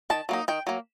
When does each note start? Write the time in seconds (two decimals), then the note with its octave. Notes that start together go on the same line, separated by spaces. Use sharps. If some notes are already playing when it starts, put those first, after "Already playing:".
0.10 D#3 A5
0.29 F#3 A#3 D#4
0.48 D#3 G5
0.67 F#3 A#3